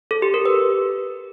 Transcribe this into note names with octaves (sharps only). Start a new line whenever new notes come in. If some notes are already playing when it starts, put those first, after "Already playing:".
A4
G4
A#4
B4